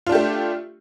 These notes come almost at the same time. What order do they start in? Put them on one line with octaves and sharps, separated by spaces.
F4 D4 G4 A3